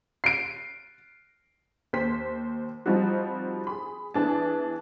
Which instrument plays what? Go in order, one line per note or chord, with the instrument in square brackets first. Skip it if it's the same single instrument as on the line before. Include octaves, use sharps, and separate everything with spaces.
[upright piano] C7 D7
[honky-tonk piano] D#2 C5 B6
F3 G3 C4 D#4 F#4
G#4 B5
E3 B3 D4 G#4 A5